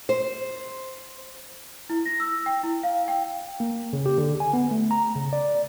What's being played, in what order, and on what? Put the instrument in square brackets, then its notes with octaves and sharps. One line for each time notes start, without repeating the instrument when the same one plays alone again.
[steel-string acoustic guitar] C5
[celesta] E4
A#6
E6
G5
E4
F5
G5
[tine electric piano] A#3
C#3
G4
D3
G#5
B3
A3
A#5
C#3
D5